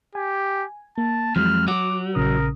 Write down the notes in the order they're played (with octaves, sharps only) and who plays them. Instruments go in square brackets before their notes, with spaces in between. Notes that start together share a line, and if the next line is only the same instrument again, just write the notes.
[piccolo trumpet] G4 [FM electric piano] G#5
[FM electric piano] A#3 [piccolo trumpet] A5
[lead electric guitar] F2 [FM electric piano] E3 F#3 G#3 [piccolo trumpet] F6
[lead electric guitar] F#3 [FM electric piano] F#4 F#5 [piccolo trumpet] D6
[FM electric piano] A#1 C#3 D#6 [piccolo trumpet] A#4